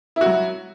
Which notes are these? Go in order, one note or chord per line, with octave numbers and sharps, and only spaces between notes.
F#3 E4 F#4